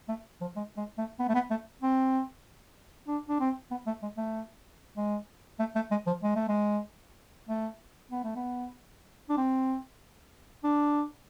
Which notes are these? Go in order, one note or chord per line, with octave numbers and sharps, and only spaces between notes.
A3
F3
G#3
G#3
A3
B3
A3
B3
A3
C4
D4
D4
C4
B3
A3
G#3
A3
G#3
A3
A3
G#3
F3
G#3
A3
G#3
A3
B3
A3
B3
D4
C4
D4